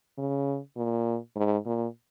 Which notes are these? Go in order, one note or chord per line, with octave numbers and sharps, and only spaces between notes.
C#3
A#2
G#2
A#2